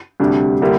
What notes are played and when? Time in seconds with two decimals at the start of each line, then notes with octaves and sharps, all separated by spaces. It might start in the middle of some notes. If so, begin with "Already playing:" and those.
0.20 D2 C3 G3 D4 G4
0.62 D3 G3 A#3 E4 G4